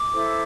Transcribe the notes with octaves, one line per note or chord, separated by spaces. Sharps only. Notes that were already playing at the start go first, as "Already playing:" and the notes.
Already playing: D6
E4 A4 C5